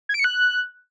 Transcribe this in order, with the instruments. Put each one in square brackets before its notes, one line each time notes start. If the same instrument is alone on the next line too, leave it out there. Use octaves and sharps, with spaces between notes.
[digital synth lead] G#6
D7
C#7
F#6